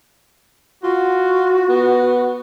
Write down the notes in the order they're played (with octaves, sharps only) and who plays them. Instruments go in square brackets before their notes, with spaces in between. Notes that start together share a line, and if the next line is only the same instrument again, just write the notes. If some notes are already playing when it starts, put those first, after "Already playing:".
[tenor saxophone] F4 [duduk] F#4
[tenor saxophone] B3